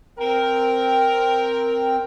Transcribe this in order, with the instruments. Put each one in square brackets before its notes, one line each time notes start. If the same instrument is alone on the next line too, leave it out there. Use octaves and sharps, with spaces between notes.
[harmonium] C4 G5 [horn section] A#4